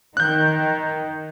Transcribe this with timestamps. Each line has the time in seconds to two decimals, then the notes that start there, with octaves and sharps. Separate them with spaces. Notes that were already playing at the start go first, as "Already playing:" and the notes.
0.17 D#3 F#6 G6